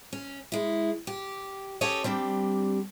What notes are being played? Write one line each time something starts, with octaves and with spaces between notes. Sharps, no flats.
C#4
G#3 E4
G4
C#4 G4 A4 C#5 D#5
G3 C4 D4 G4